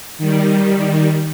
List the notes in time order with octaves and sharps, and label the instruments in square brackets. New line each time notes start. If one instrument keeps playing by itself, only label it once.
[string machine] D#3 G3